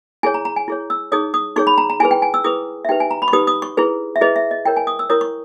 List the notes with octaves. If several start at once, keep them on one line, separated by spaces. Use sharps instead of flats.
E4 G#4 C#5 G#5
A#5
A#5
G#5
E4 G#4 C#5
E6
D#4 G#4 C#5 D#6
D#6
D#4 G#4 C#5 C#6
B5
A#5
A#5
E4 G#4 B4 G#5
G5
G#5
E6
E4 G#4 B4 D#6
E5
D#4 G4 B4 G5
G#5
A#5
B5
C#6
D#4 G4 B4 D#6
D#6
C#6
E4 G#4 B4
E5
E4 G#4 B4 D#5
E5
D#5
E4 A#4 C#5 G5
G#5
D#6
E6
E4 A#4 C#5 D#6
C#6